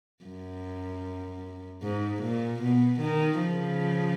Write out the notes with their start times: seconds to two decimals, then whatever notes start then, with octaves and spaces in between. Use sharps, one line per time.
0.25 F#2
1.83 G#2
2.23 A#2
2.62 B2
3.00 D#3
3.40 C#3 F3